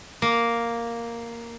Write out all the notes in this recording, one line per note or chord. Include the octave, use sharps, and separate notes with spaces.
A#3